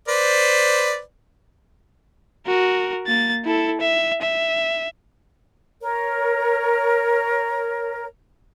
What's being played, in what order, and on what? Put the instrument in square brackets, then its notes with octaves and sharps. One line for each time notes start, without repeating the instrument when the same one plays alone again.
[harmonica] B4 C5 D5
[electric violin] F#4 A#4
A#3 A6
E4 A4
E5
E5
[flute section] A#4 C#5